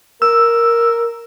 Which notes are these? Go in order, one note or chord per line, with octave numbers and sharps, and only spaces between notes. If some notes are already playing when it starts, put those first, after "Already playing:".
A#4 E6